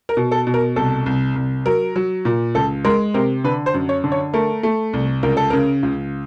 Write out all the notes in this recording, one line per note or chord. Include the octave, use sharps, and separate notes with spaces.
A#4
B2
A4
B2
A#4
C2 A4
C2
C2
F#3 A#4
F#3
A#2
C#2 A4
G#3 A#4
C3 A#4
D3 B4
C5
F#2
C#5
D3
C#5
A3 A#4
A3
C2
C#2 A#4
A4
C#3 A#4
C#2